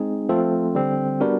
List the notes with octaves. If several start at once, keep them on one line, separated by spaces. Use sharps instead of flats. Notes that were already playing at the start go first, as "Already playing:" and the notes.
Already playing: G#3 C4 D#4 G#4
F3 A3 C4 F4 A4
D3 G3 C4
G3 B3 D4 F#4 A#4